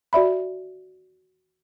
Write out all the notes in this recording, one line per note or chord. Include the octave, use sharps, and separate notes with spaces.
F#4 D5 E5 B5